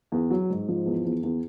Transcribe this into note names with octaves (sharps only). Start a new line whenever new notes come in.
E2
F#3
G#2
F3
E2
E2
E2